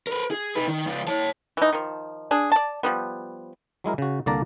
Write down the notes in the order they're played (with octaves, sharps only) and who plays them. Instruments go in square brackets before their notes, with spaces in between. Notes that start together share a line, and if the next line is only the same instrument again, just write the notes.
[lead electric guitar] A#4 B4
G#4
D#4 B4
D#3
C#2 F3
C#5 A5
[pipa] E3 D#4
D#3 F3
D4 G#4
D5 A5
F3 G3 B3
[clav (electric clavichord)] F#3 G#3 E4 A#4
C#3 F#4
C2 D3 A#3 D5 A5 A#5